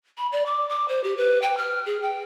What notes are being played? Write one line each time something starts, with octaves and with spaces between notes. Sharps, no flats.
B5
D5
D6
D6
C5
G4
B4
G5
F6
G#4
G5